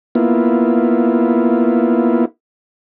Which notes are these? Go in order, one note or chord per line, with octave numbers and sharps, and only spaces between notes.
A#3 B3 E4 F4